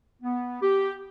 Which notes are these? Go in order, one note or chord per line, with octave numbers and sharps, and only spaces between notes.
B3
G4